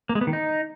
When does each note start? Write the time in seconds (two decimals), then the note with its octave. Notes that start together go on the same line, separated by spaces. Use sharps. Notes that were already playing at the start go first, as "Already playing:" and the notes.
0.09 A#3
0.15 G#3
0.21 B3
0.27 D#3
0.33 D#4